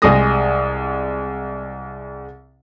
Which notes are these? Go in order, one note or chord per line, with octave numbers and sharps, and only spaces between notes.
C2 G#3 G#4 D#6 A#6